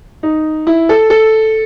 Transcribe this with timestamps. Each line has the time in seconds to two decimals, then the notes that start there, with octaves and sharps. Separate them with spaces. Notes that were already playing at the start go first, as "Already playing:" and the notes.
0.23 D#4
0.67 E4
0.89 A4
1.10 A4